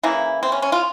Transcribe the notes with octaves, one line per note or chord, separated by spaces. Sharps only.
C#3 E3 A#3 E4
C4
C#4
C#4
F4